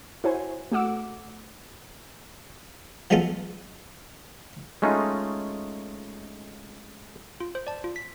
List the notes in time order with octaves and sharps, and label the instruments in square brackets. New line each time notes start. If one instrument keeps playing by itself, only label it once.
[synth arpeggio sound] E4 F#4 C5 C#5 G#5
A3 F#4 F#5 D6 E6
[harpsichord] F3 F#3 G#3 B3 F4 A4
[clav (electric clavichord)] G#3 A3 C#4 D#4 F4
[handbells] F4
C5
D5 A5
F4
B6